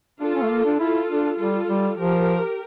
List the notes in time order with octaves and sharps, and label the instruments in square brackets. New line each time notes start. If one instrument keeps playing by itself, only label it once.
[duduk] D4 [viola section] F4 A4
[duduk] C#4
A3
A#3
D4
[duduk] E4 [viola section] F4 A4
[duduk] D4
[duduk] G3 [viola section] F4 A4
[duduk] G3
[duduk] F3 [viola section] G4 A#4